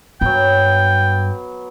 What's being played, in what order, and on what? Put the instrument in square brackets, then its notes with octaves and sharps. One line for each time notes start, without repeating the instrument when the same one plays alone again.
[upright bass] G2 [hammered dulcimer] F#3 B3 [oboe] G5